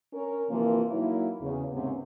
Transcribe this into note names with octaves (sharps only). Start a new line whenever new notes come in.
C#4 A#4 C#5
C3 E3 F3 A#3 F4
F#3 A#3 D#4 E4
E2 C#3
D#2 G#2 C3 B3 C#4